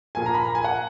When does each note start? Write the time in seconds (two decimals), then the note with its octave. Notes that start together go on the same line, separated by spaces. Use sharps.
0.15 A#2 F3 A#3 G#5
0.26 A#5
0.34 B5
0.44 A#5
0.55 G#5
0.64 F#5